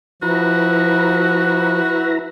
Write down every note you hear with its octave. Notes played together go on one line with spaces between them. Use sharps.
F3 E4 F#4 B4 A#5